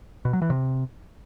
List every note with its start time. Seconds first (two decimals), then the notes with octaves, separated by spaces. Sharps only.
0.25 B2
0.33 F#3
0.42 E3
0.50 C3